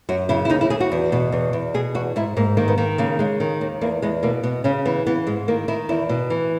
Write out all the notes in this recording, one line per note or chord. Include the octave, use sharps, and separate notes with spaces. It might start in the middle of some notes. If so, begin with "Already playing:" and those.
F#2 F#4
C#3 E4
E4
D#2 D#4
E4
D#2 G#4
F#4
E2
B2
E2
E2
B2 G#4
E2 F#4
G#2 E4
G#2 A#3
D#3 A#3
B3
D#3 A#3
C#3 A#3
C#3 G#3
D#3
D#2
E2 A#3
E2 G#3
B2 A#3
B2 B3
C#3 C#4
E3 B3
E3 B3
G#2 G#3
D#3 A#3
D#3 E4
E2 E4
B2
E3